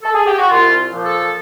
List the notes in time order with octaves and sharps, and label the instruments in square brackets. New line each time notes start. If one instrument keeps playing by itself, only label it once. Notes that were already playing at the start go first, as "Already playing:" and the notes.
[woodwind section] A4
G#4
G4
F#4
C2 F4
A#2 F3
A4